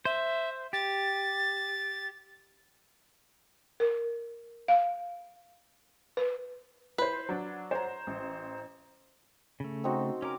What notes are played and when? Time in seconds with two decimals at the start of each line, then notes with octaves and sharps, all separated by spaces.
0.05 C5 E5
0.73 G4 A6
3.80 A#4
4.68 F5
6.17 B4
6.98 E4 B4 C5
7.29 F#3 D4
7.71 C5 C#5 A#5
8.07 A1
9.60 C#3 A3
9.84 C4 D#4 F#4
10.22 C#4 A#4 D6